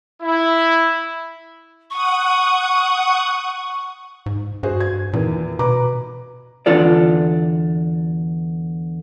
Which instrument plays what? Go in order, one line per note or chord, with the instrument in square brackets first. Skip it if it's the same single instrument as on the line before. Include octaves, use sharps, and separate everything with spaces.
[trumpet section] E4
[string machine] F#5 D#6 [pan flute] C#6
[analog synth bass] G#2
[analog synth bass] G2 [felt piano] F#4 G#4 C5
[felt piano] G#6
[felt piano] E2 D#3 [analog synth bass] A#2
[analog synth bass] B2 [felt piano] B4 A#5 D6
[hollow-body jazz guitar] E2 D3 F4 A4 D5